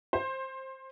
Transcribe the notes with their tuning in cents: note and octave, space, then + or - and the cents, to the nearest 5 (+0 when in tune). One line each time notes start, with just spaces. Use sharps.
C5 +15